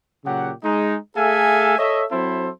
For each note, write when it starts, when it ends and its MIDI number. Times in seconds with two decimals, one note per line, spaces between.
0.24 0.50 46
0.24 0.50 49
0.24 0.50 54
0.24 0.50 67
0.24 0.50 78
0.63 0.95 56
0.63 0.95 63
1.16 1.77 57
1.16 1.77 68
1.16 1.77 69
1.16 1.77 76
1.16 1.77 77
1.16 1.77 80
1.78 2.03 69
1.78 2.03 73
1.78 2.03 75
1.78 2.03 76
2.11 2.48 54
2.11 2.48 60
2.11 2.48 64
2.11 2.48 69
2.11 2.48 72
2.11 2.48 76